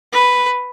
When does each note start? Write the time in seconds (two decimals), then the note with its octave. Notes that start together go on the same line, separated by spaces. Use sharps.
0.13 B4